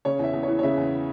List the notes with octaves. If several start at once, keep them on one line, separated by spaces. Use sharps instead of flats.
C#3 C#5
E2 E5
E2
E3 C#5
C#5
C#3 E5
E2